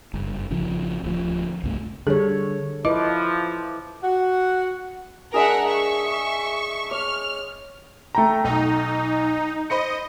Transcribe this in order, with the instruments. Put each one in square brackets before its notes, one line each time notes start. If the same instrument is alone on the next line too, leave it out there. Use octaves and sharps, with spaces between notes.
[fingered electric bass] F#1 G2
A1 C#3 F3
D1 D2 F3
C2 G2 A3
[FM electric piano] D3 G3 [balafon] G#4 [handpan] A4 C#5
[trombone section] F3 [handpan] E4 B4 [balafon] D#5 [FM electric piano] D6
[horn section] F#4 F#5
[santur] G#3 D4 G#4 [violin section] A#4 E5 F#5
[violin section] E5 C#6
[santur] C#5 D6 [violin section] F6
[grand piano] A3 G5 A#5
[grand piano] B1 [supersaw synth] D#4
[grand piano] C5 B5 C#7 [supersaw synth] D#5